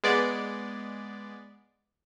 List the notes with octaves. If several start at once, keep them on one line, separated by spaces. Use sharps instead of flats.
G#3 B3 D5